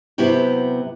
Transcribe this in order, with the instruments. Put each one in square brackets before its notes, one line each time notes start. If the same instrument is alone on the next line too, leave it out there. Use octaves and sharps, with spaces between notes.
[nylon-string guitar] C3 F#3 B3 E4 F#4 G4